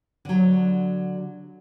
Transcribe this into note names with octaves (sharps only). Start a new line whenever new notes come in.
D3 F#3